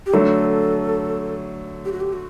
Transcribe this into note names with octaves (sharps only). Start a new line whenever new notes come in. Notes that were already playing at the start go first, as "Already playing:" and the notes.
G4
D3 F#3 A3 A4
G4
F#4
G4
F#4